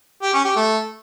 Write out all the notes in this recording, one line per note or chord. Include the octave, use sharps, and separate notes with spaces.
G4
C#4
G4
A3